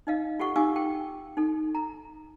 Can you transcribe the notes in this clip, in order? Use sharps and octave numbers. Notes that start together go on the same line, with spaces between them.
D#4 D#5 F5
F4 G4 A4 F#5 C#6
D#4 G4 F5 G#5 D6 E6
G5
D#4 A4
A#5